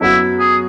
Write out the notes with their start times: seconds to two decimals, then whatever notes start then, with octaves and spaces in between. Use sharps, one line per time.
0.01 F#2 F#3 B3 E4 F#4
0.39 G#4